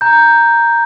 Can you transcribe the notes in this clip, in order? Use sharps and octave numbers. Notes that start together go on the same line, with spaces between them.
A#5 G6